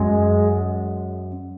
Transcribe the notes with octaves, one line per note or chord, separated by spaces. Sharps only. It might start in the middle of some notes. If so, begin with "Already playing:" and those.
Already playing: F#2 G#3